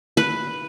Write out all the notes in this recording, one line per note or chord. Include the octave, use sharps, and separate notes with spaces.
B4